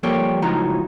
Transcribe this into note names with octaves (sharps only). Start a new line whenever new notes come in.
F3 G3 A#3 G4 A4 C#5
C#2 A2 F3 F#3 D#4 A#5